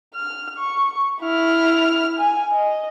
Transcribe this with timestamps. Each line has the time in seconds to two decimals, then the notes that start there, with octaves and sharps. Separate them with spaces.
0.14 F6
0.58 C#6
1.22 E4 F6
2.19 G#5
2.52 D#5